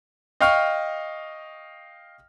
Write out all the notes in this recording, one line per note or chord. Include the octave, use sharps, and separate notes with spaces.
D#5 F5 G5 C#6 F6